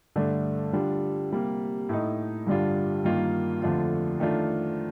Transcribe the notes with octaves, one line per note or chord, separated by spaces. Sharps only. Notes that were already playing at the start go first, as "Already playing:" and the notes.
G2 D3 A3 D4
D3 G3 D4 F4
C3 G3 A#3
A2 A3 D#4
G2 D3 G3 D4 F4
G2 D#3 A#3 F4
F2 D3 A3 D4 F4
D#3 A3 D4 F4